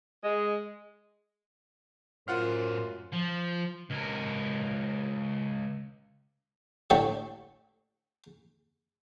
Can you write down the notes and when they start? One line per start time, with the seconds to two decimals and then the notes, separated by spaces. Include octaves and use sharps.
0.24 G#3
2.28 F#2 A2 F4 A#4 C5 F#5 F6
3.13 F3
3.91 C#2 A#4
6.90 A2 D3 G4 D5 C#6